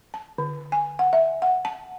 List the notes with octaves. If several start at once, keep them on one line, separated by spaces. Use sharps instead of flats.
A5
D3
G#5
F#5
E5
F#5
A5